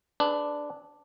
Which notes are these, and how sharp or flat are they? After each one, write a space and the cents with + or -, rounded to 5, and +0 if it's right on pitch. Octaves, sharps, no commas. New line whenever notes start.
D4 +0 G#4 +35 B4 +25